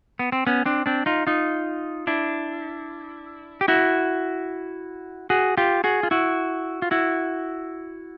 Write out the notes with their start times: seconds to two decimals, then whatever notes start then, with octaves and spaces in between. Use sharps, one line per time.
0.19 B3
0.32 C4
0.47 B3 C#4
0.66 C4 D4
0.86 C4 D4
1.06 D#4 F4
1.27 D#4 F4
2.07 D4 E4
3.61 G4
3.68 E4 F#4
5.30 F#4 G#4
5.57 F4 G4
5.84 F#4 G#4
6.03 F4
6.11 E4 F#4
6.82 F4
6.91 E4 F#4